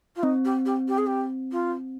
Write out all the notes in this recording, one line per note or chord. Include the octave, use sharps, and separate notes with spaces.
F4
C4 D#4
G4
G4
G4
G#4
G4
F4